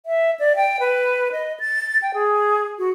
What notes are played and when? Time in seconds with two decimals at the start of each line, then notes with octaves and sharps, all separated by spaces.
0.06 E5
0.40 D5
0.56 G5
0.80 B4
1.32 D#5
1.60 A6
2.02 G5
2.14 G#4
2.78 F#4